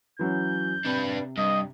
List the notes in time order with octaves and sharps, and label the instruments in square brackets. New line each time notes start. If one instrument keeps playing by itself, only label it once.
[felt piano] E3 F#3 C#4 [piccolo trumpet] G6
[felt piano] C3 [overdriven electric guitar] D4 B4
[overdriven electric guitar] G2 [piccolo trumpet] D#5